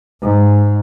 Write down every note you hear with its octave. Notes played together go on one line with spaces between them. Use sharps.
G#2